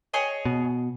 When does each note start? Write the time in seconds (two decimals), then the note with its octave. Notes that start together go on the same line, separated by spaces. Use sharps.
0.14 G#4 C#5 D#5
0.45 B2